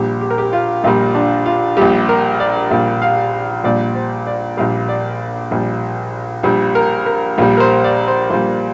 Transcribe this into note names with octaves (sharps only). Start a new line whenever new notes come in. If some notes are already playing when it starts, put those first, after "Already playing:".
Already playing: A#1 A#2 G3 G4
G4
A#4
G4
F4
A#1 A#2 G3 F4
D4
F4
A#1 A#2 G3 G4
A#4
D5
A#1 A#2 G3
F5
A#1 A#2 G3 D5
C5
D5
A#1 A#2 G3 F5
D5
A#1 A#2 G3
A#1 A#2 G3
A#4
A#4
A#1 A#2 G3
A#4
C5
D5
C5
A#1 A#2 G3 C5